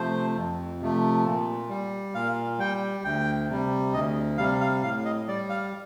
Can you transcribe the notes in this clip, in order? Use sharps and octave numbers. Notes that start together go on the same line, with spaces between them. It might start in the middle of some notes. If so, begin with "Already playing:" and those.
Already playing: C3 F3 A3 C5
F2
C3 F3 A3
A#2
G3
A#2 F5
G3 G5
D2 G5
C3 G3
D2 D#5
C3 G3 F5
F5
A2 F5
D#5
G3 D5
F5